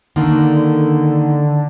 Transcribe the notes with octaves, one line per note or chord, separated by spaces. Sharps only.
D3 D#3 A#3